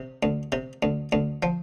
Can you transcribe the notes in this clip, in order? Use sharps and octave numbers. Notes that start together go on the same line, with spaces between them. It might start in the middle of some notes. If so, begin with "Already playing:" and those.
Already playing: C3
D2
C3
D2
D2
F3